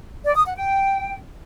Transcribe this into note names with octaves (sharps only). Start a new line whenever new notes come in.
D5
D#6
F#5
G5